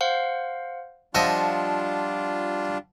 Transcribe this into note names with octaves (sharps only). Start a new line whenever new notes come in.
C5 F5 F#5
F3 G3 D4 F4 D#5 E5 F#5 A5